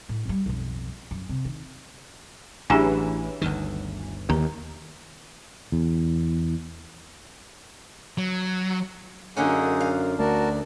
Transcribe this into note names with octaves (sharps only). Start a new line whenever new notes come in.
A2
G2 G3
B1 F2
F#2
C3
D#3
A1 E3 F#3 D4 G4 G#4
G1 D2 D#3
D#2 A#5
E2
F#3
F#2 D3 A#3 C#4 D#4 G#4 F#5
F5
D2 A3 F#4 A#4 D5 A5